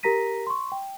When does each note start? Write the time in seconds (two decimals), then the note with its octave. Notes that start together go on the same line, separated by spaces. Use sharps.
0.03 G4 A#4 A#5 A#6 B6 D#7
0.47 C6 C#6
0.72 G5